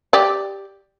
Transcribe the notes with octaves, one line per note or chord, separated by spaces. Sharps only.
G4 D5